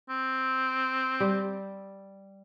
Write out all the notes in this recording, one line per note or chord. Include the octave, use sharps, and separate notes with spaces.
C4
G3